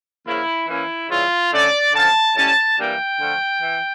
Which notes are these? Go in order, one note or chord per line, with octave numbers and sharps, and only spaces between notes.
C#3 F3 A#3 E4
E3 A#3 C#4 E4
C#3 E3 G3 F4
D3 A3 C#4 D5
D3 F3 C#4 A5
A2 G3 C#4 A5
E3 G3 A#3 D4 G5
D3 F3 A3
E3